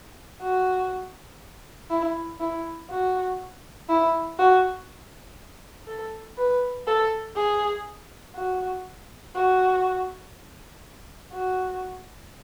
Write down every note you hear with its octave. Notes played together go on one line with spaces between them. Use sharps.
F#4
E4
E4
F#4
E4
F#4
A4
B4
A4
G#4
F#4
F#4
F#4